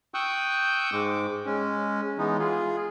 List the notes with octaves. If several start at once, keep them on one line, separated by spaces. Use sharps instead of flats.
G5 C#6 D#6 E6 F#6 G6
G#2 G#3 D6
G#3 C#4
E3 G#3 B3 D#4
F4 G#4